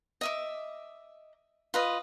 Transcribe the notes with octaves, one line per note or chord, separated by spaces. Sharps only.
D#5 E5 D6
F4 B4 D#5